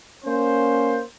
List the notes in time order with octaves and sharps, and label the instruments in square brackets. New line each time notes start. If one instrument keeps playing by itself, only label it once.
[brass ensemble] A#3 C#4 C5